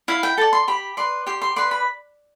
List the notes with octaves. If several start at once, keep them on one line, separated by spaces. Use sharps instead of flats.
E4 F5
G5
A4 D5 A5
C6
G4 B5
B4 D5 C6
G4 C6
C6
B4 D5 C6
B5